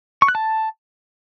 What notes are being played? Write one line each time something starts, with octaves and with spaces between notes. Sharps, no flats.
C#6
F#6
A5